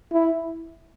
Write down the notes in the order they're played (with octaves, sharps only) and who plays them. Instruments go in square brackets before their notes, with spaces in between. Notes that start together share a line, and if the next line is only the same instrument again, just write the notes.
[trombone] E4